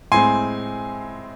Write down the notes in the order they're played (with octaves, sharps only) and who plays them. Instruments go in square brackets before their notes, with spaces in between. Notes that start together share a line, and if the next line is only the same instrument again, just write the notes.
[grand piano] A2 G#3 C4 G#5 C6